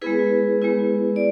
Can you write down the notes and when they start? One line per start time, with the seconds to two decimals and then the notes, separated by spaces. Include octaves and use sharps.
0.02 G#3 B3 E4 G#4 B4
0.62 G#3 B3 E4
1.16 D5